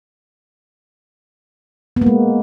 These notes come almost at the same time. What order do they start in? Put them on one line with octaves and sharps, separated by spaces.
B3 A#3 G#3